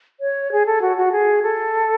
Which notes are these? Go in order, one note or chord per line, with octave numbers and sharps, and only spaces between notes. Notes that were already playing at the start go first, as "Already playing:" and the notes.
C#5
G#4
A4
F#4
F#4
G#4
A4